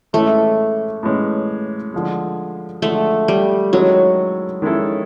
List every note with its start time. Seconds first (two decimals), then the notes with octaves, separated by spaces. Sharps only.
0.13 A2 E3 G#3 A3 C#4
1.03 A2 E3 G#3 C#4
1.94 D3 F3 G#3
2.82 D3 F3 G#3 A3
3.28 G3
3.72 D#3 F#3 G#3 C#4 E4 A4
4.62 D#3 G#3 C#4 E4 A4